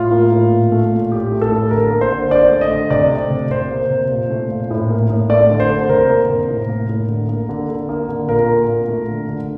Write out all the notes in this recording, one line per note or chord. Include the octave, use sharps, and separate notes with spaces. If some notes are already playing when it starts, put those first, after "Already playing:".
Already playing: A2 F4
A#3
A2
A#2
A3
A#2
A2 G4
A3
A4
A2
D3 A#4
A#3
C5
D3
D3 D5
A3
D#5
D3
C3 D5
A3
C3
C3 C5
A#3
C3
A#2
A3
A#2
A2
A#3
A2
A3 D5
D3
C5
D3
C3 A#4
A#3
C3
A2
A#3
A2
D3
A#3
D3
D3
A#3
D3
A#2 A#4
A#3
A#2
A3
D3
D3